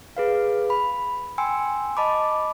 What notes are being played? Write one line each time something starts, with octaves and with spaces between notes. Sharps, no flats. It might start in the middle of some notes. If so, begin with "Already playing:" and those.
G#4 B4 F5
B5
G5 G#5 C6 E6 C#7
D#5 A5 B5 D6